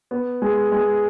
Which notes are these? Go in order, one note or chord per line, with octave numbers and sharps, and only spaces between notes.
B3
G#3
G#3